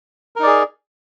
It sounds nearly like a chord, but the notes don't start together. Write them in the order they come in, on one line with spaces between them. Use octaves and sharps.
A#4 D#4 D5 G#4